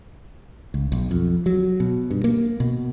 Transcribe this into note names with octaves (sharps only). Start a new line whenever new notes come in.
C#2
B1
F2
F#3
B2
G2
A#3
B2